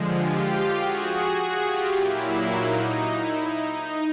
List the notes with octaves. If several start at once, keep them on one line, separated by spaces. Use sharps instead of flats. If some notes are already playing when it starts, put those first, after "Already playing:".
Already playing: D3 F3 G#3
F4 G4
F#4 G#4
F#4 G#4
F4 G4
A#2 F#3 A#3 E4
D#4
E4
D#4
D#4